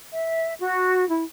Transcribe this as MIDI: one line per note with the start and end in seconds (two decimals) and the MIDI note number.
0.15 0.54 76
0.60 1.08 66
1.10 1.25 64